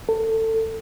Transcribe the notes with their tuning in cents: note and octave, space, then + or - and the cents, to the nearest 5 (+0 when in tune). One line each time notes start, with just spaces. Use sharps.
A4 +25